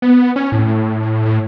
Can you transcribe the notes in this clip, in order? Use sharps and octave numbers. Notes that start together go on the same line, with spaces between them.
B3
C#4
A2
A2